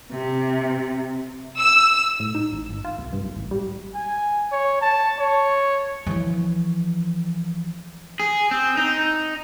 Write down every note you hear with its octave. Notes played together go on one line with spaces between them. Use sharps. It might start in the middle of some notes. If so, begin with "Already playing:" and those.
C3
E6
A2
D#4
A1
G#1
F4
C2
G2
B1
A1
G3
G#5
C#5
A5
C#5
E3 F3
G#4
C4
D#4